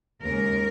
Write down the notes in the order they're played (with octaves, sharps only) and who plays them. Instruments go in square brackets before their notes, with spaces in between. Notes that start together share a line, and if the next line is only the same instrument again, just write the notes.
[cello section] D#2 C#3 G#3 A#4